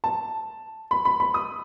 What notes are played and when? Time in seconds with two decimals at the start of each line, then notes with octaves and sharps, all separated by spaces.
0.04 A5
0.91 B5
1.05 B5
1.20 B5
1.34 D#6